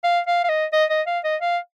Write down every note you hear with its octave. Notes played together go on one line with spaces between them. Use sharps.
F5
F5
F5
D#5
D#5
D#5
F5
D#5
F5